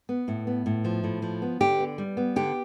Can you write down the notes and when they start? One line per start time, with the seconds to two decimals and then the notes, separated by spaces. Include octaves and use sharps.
0.09 B3
0.28 A2
0.47 B3
0.66 A2
0.85 F3
1.04 A2
1.22 F3
1.42 B3
1.60 D3 G4
1.79 B3
1.98 G3
2.17 B3
2.36 D3 G4